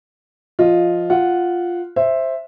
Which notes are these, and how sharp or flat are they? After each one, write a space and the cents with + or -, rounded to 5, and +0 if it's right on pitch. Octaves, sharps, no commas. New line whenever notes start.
F3 -5 F4 +0 D#5 +0
F4 +0 F#5 +0
C5 +10 E5 +0